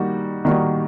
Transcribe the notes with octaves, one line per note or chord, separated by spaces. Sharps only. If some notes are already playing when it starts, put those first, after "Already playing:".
Already playing: D#3 G3 A#3 D#4 F#4
D#3 G3 A#3 D#4 F#4